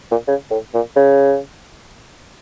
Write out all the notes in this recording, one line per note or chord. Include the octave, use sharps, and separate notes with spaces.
A#2
C#3
A2
A#2
C#3